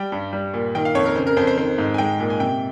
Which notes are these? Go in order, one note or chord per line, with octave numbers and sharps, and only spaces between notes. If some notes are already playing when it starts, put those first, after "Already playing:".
Already playing: G3 G5
G2
G3
A#2
D#3 G5
F5
F2 C#5
A#4
C#3 C5
A#4
F2 C5
C5
D#3 C5
G#2
G#5
G#3 G5
A#2
G#5
C3 G5